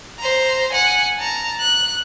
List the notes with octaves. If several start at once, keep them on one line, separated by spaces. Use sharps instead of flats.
C5 A#5
F#5 G#5
A5 A#5
F#6